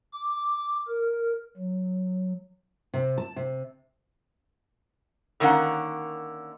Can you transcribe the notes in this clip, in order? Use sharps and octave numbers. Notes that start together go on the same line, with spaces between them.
D6
A#4
F#3
C3
A5
C3
D3 D#3 A#3 C#4 F#5